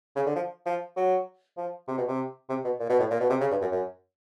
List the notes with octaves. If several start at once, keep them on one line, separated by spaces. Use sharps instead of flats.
C#3
D3
F3
F3
F#3
F3
C3
B2
C3
C3
B2
A#2
B2
A2
A#2
B2
C3
C#3
G2
F#2
F#2